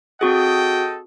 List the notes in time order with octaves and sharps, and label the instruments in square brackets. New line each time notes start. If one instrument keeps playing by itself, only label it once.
[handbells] C4 F#4 G#4 [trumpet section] A4 D#5 G5